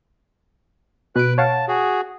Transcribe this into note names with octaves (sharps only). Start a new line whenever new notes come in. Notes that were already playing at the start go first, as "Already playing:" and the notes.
B2 B4 F#6 D7
C#5 F5 F#5 A5
F#4 G#4